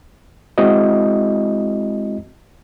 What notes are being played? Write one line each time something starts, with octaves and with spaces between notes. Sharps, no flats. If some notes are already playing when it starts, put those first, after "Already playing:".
G#3 C4 E4 F#4 D#5